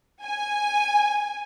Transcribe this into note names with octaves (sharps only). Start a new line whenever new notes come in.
G#5